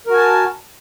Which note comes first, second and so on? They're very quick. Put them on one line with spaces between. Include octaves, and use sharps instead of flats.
A#4 F#4 G#5 A5